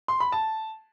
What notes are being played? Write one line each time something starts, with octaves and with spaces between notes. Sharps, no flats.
C6
B5
A5